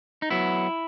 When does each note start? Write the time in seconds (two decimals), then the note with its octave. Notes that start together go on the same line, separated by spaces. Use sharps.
0.22 D#4
0.30 F#3 B3 E4